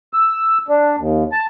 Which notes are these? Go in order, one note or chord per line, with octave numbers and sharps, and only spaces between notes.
E6
D4
D#2
A5